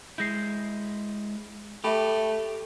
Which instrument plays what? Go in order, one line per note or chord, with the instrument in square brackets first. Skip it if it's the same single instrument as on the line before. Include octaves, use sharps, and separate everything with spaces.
[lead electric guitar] G#3 E4 [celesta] G6 A#6 C7
[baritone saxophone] A3 [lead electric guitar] G4 [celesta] A4 E5 B5